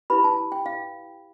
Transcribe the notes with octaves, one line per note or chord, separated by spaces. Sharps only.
E4 G4 B4 B5
A5
G5
F5